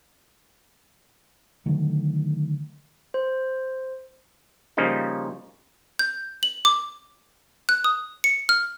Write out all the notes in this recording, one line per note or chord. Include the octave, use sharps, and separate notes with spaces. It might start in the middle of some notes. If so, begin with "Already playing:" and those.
D3 D#3 F#3 A3
C5
C#3 F3 G3 A#3 C#4 D#4
G6
F#7
D6
F#6
D#6
C#7
F6